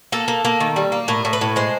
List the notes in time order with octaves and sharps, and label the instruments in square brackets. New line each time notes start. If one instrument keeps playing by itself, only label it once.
[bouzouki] A#3 A4
A#3
A#3
D#3
G3
A#3
A2 A#4
A2
B4
A2
G#3 C5